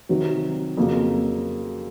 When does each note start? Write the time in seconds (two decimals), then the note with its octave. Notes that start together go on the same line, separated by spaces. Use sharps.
0.09 C3 D#3 F#3
0.77 F2 C#3 F#3 A#3